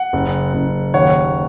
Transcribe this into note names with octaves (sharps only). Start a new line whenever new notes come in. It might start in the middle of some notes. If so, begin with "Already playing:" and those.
Already playing: F#5
F#1
F#1
D#2 C#5 F#5